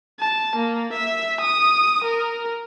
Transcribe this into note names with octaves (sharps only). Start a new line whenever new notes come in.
A5
A#3
E5
D#6
A#4